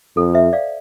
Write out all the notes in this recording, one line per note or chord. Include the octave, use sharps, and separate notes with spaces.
F2 A4
C5 E5
D5 F5